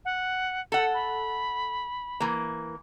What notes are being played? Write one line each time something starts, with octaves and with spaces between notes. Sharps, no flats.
F#5
A4 F#5 C#7
B5
E3 A#3